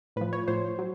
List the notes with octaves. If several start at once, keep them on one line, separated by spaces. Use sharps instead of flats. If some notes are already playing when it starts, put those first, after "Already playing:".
A2 F3 B4
C#5
A2 F3 C5
F#3